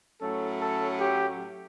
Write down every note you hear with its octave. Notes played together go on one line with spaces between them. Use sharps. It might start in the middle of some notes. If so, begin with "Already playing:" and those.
A2 F#3 A3 C#4 A4
A4
G4